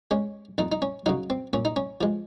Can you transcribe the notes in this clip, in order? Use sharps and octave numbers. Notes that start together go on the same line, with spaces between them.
G#3 C#4
F2 D#4
D#4
C#4
C#3 F#3 D#4
C4
A#2 C#4
D#4
C#4
F3 G#3